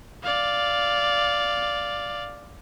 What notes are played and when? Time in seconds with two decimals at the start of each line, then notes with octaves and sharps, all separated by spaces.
0.24 D5 F5